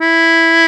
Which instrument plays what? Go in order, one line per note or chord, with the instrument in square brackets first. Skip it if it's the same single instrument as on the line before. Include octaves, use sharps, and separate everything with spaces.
[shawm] E4